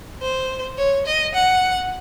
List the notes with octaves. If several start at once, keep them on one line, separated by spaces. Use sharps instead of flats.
C5
C#5
D#5
F#5